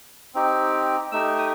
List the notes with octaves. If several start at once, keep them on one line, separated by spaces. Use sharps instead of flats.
C4 D#4 G4
A3 D#4 G4 E6
D#6